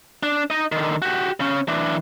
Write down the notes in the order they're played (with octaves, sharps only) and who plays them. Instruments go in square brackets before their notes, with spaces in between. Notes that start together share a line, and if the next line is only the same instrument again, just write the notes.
[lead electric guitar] D4
D#4 D#5
D3 D#3
F#4 G4
C#3 C#4
E3 D4